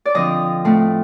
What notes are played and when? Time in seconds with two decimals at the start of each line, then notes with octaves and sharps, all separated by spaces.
0.05 D5
0.14 D3 F3 C4 D#5
0.65 A2 A3 C4